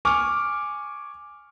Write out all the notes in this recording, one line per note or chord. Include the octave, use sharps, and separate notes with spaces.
G#5 C#6 D6 F6